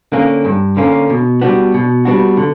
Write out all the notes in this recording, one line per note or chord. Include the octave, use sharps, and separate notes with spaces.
D3 A#3 C#4
G2
D3 A#3 C#4
B2
G3 B3 D4 F#4
B2
G3 B3 D4 F#4
D3